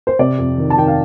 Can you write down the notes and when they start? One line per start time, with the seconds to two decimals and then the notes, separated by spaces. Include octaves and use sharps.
0.07 C5
0.19 C3 D5
0.38 F2
0.58 D#3
0.70 A5
0.77 D#3 G5
0.88 F5